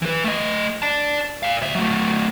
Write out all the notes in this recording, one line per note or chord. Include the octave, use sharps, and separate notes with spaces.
E3 B4
A3 D#5
D5 A5
D5 F5
D2 E5
F#3 A3